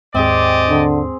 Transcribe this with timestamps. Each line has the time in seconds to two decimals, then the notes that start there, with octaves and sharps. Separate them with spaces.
0.14 D#2 G#2 C4 G4 G#4 D5 D#5
0.69 D3